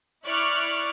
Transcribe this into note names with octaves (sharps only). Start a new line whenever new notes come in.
E4 D5 C#6 F6 F#6